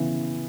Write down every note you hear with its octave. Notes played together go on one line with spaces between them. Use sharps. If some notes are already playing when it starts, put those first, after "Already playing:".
Already playing: C#3 E3 B3